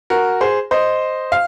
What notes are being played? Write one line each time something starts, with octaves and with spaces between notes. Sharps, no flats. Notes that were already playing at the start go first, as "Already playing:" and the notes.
F#4 A#4
G#4 C5
C5 D#5
F5